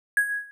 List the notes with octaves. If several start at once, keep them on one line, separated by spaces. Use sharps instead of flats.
G#6